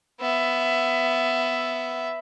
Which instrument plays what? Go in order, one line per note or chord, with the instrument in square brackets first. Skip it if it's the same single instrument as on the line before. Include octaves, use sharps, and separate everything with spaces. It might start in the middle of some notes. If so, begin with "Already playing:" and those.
[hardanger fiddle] B3 E5